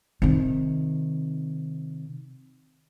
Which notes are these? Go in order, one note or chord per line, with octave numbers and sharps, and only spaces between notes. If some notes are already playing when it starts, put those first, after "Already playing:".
C3 D#3